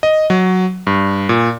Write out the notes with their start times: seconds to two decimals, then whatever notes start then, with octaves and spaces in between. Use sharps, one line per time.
0.03 D#5
0.30 F#3
0.87 G2
1.29 A#2